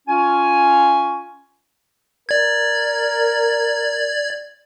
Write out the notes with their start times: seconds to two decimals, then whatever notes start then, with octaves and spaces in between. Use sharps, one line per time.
0.08 C#4 F4 G#5
2.29 A#4 D5 G#6